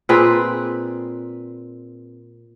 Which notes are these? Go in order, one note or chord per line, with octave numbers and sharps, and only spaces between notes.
A#2 C4 G#4 B4